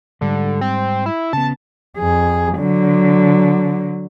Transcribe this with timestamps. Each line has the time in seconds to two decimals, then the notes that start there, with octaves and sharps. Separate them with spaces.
0.21 G#2 D3 G3
0.61 C4
1.06 E4
1.33 C#3 B3 A5
1.98 F2 G#4
2.58 D3 F#3